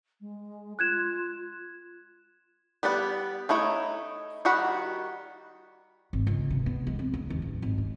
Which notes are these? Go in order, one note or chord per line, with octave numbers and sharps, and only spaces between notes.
G#3
F4 F#6 G#6 E7
G3 B3 G4 D5 F#5
A3 D#4 E4 C#5
D#3 G3 F#4 F#5 B5
G#1
C#2
C3
B3
G#3
C4
C#2
D#2
A1
G#1
G#3